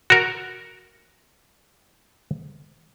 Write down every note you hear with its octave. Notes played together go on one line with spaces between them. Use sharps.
F#4 A#4